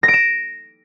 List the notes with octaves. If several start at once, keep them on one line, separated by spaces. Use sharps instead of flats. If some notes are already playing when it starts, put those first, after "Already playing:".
A#6
D7
E7